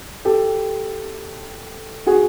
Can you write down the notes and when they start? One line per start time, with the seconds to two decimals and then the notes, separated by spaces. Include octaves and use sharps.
0.25 G4 A4
2.07 F#4 G#4